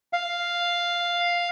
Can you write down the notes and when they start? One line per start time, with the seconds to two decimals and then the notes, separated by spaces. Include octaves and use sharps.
0.13 F5